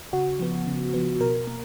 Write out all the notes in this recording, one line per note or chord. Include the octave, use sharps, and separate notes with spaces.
C#3 F#4
F3 B3
C#3
F3 B3
B2 A#4
A#3